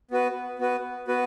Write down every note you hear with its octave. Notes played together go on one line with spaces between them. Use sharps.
B3 F#4 B4
B3 F#4 B4
B3 F#4 B4